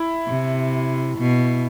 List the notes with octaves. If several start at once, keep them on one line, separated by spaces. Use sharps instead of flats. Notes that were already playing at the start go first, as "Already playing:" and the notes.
Already playing: E4
C3
B2